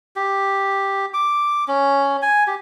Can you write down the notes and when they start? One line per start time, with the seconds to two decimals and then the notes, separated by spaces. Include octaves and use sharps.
0.16 G4
1.14 D6
1.68 C#4
2.22 G#5
2.47 G4